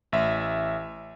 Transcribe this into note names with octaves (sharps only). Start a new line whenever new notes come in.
A1 E5